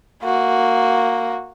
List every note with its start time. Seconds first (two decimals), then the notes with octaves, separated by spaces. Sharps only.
0.23 A#3 F#4